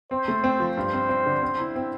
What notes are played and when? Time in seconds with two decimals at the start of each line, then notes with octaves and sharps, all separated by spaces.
0.11 C4 C5
0.28 A3
0.44 C4
0.60 F3
0.77 G2 C5
0.93 C4
1.09 C4
1.26 D3
1.42 C4
1.59 E4
1.76 C4